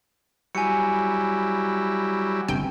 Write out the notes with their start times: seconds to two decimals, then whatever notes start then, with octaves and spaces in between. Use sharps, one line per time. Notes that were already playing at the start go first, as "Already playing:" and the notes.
0.55 F#3 G3 E4 G#5 C#7
2.48 G1 C3 G5